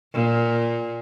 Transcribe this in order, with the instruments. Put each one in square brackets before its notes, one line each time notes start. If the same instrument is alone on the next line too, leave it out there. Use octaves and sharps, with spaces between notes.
[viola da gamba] A#2